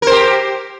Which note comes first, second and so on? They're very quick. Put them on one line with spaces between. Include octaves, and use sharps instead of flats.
A#4 C5 G4